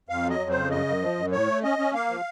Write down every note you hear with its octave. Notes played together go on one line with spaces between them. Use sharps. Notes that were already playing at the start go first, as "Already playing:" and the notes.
F2 F5
F#3
D#5
F2
C#3 C5
F#2 D#5
F#2
F3
F#2
A2 C#5
A3
C#4 D#5
C#4
A#3 F5
F3